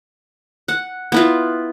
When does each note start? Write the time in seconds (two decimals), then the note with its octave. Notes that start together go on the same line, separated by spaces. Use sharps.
0.68 F#5
1.12 B3 E4 F4